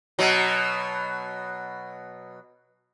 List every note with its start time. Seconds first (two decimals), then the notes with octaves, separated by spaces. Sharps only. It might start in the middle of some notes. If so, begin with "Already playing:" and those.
0.19 B2 F#3